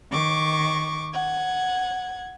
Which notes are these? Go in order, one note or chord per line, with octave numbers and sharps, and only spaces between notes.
D#3 C#6 D6
F#5 G#6